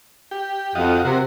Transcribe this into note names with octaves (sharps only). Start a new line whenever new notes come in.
G4
F2 F4 F#4 D#5
C3 F#4 A#4 C5